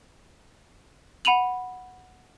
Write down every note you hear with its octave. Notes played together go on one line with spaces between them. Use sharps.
F#5 B5 D#7 F7 F#7